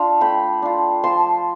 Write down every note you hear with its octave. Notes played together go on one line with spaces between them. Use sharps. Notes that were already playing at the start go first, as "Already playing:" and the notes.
Already playing: D4 F4 F5 A5
A3 G5 B5
D4 F4
F3 A5 C6